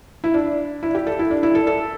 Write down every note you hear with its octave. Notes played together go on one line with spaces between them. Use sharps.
E4
D4
E4
G4
A4
E4
D4
E4
A4
A4